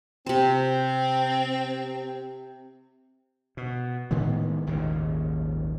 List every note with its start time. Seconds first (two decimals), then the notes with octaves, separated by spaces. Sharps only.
0.26 C3 C4 C5
3.57 B2
4.11 A2 D#3 G#3 B3
4.67 G#1 D#2 A#2 C#3